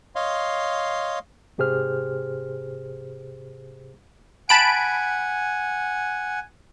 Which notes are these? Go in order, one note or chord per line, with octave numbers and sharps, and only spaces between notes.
C#5 D#5 F5 C6
G#2 C3 G4 G#4 C5 F6
F#5 G#5 A5 B5 D7